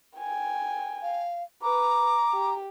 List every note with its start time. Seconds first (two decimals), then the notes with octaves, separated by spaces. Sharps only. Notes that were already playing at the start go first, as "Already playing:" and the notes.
0.18 G5 G#5
1.02 F5
1.63 B4 A#5 D6
2.33 G4